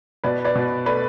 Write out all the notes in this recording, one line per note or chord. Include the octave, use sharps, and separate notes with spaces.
B2 B4 D5
B4 D5
B2
A3 B4 D5